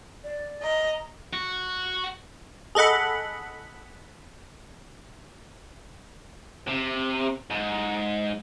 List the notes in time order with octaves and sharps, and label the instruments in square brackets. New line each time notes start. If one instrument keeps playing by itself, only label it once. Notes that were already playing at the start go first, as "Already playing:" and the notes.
[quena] D5
[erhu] D#5 [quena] A#5
[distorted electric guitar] F#4
[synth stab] G#4 A4 D#5 F#5 B5
[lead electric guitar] C3
G#2